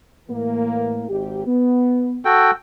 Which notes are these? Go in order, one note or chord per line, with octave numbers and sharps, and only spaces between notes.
A2 E3 A#3
G#1 G#2 G4
B3
F#4 A4 G5